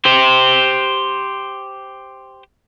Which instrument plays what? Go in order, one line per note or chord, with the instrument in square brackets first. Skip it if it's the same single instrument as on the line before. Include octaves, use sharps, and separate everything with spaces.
[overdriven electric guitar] G4 C5